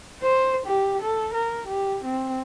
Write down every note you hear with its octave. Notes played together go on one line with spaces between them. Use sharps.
C5
G4
A4
A#4
G4
C4